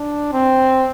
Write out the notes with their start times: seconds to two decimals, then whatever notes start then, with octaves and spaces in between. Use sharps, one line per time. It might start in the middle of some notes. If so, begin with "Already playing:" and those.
Already playing: D4
0.33 C4